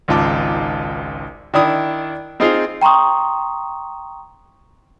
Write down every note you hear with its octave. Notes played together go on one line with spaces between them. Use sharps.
G#1 C#2 D#4 F4 A5 D6
D#3 D4 E4 D#6
C4 D#4 F4 G#4 C5
G5 A#5 C6 C#6 D#6